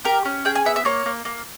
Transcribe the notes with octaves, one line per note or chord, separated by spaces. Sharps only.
G4 A#4
C#4
G#4 G5
G#5
B3 E5
E5
A#3 C#5
A#3
A#3